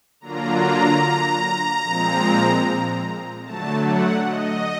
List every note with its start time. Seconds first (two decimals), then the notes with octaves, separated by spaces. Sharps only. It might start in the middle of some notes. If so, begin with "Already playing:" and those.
0.20 D3 F#3 A#3 D4 F4 A#5
1.82 A#2 F3 G#3 C4
3.44 D3 F#3 A3 A5
3.85 F#5
4.25 D#5